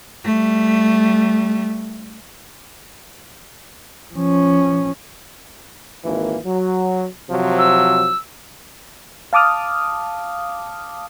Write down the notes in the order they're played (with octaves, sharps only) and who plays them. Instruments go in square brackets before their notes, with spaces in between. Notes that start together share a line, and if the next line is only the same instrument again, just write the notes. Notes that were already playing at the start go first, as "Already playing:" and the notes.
[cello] G3 A3
[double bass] F3 C#4
[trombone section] G#1 E3 A#3
F#3
C3 F3 F#3
[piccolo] E6
[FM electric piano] F5 A5 D6 D#6 F6